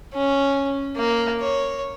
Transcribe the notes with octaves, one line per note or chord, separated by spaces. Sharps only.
C#4
A#3
C#5